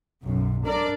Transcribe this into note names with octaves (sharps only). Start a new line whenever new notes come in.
B1 F#2
D4 A#4 D5